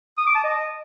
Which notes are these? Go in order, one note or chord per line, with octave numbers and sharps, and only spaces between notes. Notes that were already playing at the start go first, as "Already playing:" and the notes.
D#6
D6
A5
D#5